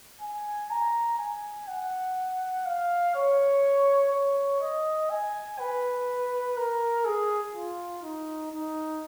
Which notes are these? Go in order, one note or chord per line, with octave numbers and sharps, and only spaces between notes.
G#5
A#5
G#5
F#5
F5
C#5
C#5
D#5
G#5
B4
A#4
G#4
F4
D#4
D#4